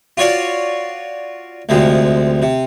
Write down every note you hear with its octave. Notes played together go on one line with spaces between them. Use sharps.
F4 F#4 C#5 D5 F5
D2 C3 F3 G#3
C3